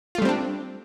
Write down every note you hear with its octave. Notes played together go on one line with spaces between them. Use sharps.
G3 A3 C4 D4 F4